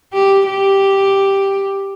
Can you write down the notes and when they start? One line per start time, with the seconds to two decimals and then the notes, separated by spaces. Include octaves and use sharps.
0.14 G4
0.46 G4